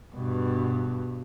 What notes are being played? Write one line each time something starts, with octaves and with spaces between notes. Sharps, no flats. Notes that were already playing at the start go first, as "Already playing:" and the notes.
G2 B2